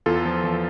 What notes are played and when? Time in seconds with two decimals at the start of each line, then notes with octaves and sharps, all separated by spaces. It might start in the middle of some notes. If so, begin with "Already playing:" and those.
0.06 E2 F4 A4
0.25 F3
0.44 E2